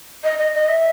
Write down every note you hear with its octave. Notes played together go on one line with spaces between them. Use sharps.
D#5
D#5
D#5
E5